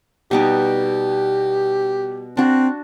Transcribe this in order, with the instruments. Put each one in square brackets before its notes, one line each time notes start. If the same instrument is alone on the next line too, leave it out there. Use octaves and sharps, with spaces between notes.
[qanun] B2 G3 D#4 [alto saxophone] G4
[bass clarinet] C4 [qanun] D4 F#4